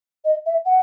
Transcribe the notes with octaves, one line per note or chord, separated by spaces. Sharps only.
D#5
E5
F#5